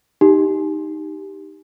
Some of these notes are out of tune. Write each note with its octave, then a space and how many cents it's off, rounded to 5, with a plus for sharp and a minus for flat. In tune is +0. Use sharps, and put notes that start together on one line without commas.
D#4 +0 G4 +0